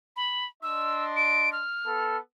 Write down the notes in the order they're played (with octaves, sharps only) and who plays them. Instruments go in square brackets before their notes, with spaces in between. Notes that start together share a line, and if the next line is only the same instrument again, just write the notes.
[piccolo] B5
[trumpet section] D4 D#5 C6 [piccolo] E6
[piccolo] D7
F6
[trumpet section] B3 A4